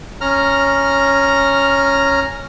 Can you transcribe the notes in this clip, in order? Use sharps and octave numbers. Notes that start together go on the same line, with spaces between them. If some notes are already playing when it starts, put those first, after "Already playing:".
C#4 A#5 F6